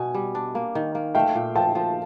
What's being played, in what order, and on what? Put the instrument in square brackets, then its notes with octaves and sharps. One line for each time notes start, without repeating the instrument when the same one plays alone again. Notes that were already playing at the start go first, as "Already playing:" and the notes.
Already playing: [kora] B2 [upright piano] G#5
[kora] G3
D4
A#3
D#3
A#3
[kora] A3 [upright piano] F5 G5
[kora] A#2
[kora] F3 [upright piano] G5 A5
[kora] F3